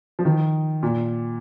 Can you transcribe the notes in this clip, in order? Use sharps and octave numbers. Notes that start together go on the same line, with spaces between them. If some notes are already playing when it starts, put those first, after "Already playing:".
F3
D#3
A#2